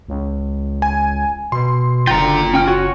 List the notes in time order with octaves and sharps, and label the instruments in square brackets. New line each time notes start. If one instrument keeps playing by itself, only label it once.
[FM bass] C#2
[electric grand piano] G#5
[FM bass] B2 [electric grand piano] C6
[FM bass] F#1 [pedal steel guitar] D3 G5 [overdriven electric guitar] F4 A#5
[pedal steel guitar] C#4 G5 F6
[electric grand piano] F#4 [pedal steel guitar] C#5 F#5 G#5